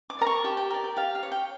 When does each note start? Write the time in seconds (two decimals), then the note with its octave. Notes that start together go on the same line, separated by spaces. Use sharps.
0.10 D6
0.19 A#4 D5 A#5
0.27 C#6
0.44 G4 A5
0.57 G5
0.71 A#4 D5
0.84 G5
0.96 G4 F5
1.15 F5
1.23 C#5
1.32 G5